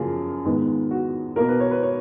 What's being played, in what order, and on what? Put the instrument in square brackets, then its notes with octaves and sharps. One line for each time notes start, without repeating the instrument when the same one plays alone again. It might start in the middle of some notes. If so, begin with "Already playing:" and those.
Already playing: [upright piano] F#2 C#3 F3 A#3 F4 G#4
G#2 D#3 G#3 B3
F#4
B2 A#3 A#4
B4
C#5
B4
C#5